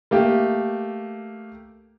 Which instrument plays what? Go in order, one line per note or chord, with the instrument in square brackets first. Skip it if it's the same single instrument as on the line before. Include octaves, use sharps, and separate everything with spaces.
[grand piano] A3 A#3 G4